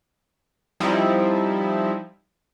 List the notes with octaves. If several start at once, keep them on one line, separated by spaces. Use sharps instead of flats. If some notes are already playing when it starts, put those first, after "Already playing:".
F3 G3 C4 D#4 E4